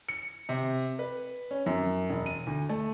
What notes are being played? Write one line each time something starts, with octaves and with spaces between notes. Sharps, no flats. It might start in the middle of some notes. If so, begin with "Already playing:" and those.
C#7
C3
B4
C#4
F#2
E1
D#7
D2
A3